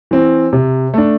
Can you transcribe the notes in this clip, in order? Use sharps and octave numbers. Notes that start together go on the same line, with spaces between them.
E3 C4
C3
A3 D4